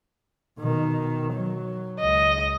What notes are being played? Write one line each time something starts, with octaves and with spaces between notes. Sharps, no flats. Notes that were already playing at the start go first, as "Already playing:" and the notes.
B2 D#3
F#3
C#2 D#5